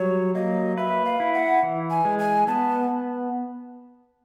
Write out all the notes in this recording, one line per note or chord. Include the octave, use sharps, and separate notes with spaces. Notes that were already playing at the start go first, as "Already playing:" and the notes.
Already playing: F#3 G3 C#5
A#3 D#5
B4 E5
F5
E4
F#5
E3
G#5
G#3
G#5
B3 A5